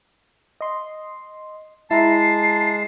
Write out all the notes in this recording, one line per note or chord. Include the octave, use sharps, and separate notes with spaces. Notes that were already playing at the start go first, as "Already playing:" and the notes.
D#5 C6
G#3 E4 A5 A#5 C7